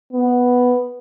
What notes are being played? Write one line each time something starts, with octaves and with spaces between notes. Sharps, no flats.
B3